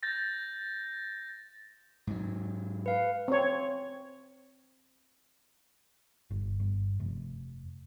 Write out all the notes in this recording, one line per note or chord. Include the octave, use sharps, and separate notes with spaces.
G6 A6 A#6
G#2 F#3
B4 F5
C4 C#5
G1
G1
F1